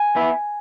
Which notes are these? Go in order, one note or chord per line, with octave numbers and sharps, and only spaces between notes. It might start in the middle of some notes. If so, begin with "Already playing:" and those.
Already playing: G#5
B3 E4